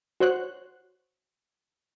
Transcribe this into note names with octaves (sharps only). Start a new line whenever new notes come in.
F#4 C5 C#5 F#6